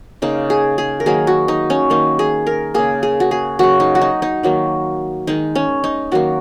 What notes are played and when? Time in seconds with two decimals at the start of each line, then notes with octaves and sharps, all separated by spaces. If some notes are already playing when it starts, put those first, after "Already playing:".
0.22 C#3 A#3 D#4
0.50 G#4
0.78 G#4
1.00 A#4
1.06 D#3 F#3 A#3 G#4
1.27 F#4
1.48 D#4
1.70 C#4
1.90 D#3 A#3 D#4
2.19 G#4
2.47 A#4
2.74 C#3 A#3 G#4
3.03 G#4
3.20 F#4
3.31 G#4
3.59 C#3 F#3 A#3 F#4
3.80 D#4
3.95 F#4
4.01 D#4
4.22 D#4
4.43 D#3 F#3 A#3
5.27 D#3 G#3 D#4
5.55 C#4
5.84 D#4
6.12 D#3 F#3 A#3 F#4